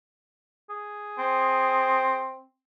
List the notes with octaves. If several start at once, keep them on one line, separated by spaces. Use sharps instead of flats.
G#4
C4